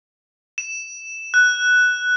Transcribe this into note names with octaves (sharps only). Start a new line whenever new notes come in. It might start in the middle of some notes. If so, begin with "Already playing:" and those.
E7
F#6